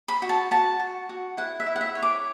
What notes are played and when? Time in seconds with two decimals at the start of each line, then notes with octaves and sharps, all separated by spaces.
0.08 B5
0.22 F#4
0.29 A5
0.51 F#4 A5
0.80 F#4
1.09 F#4
1.37 E4 F#5
1.60 E5
1.66 E4
1.76 F#5
1.81 E5
1.95 C#5
2.02 D6